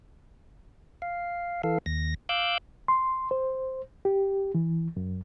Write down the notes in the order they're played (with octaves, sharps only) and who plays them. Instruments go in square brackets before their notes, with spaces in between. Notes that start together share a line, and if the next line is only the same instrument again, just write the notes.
[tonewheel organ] F5
E3 A4 F5
D#2 A#6
F5 D6 E6 F#6 G6
[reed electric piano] C6
C5
G4
E3
F#2